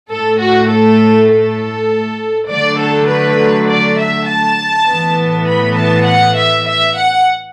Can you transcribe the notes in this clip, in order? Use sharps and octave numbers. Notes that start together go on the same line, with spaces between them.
A2 A3 A4
F#4
A4
A4
D3 F#3 A3 D5
A4
B4
D5
E5
A5
A2 E3 B3
B5
A5
F#5
E5
E5
F#5